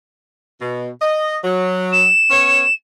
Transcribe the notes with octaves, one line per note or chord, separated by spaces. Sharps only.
B2
D#5
F#3
E7
B3 C#4 C#5